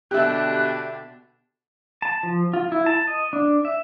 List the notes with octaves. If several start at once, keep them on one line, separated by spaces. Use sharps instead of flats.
B2 D3 D4 G4 E5 F#6
A5
F3
F4
E4
A5
D#5
D4
E5